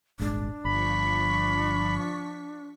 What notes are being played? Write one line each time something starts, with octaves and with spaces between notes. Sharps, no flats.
D#1 G#1 G#3 D4
G1 F3 B5 C#6 B6